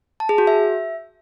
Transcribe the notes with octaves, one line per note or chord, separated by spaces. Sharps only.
A5
G#4
F#4
E5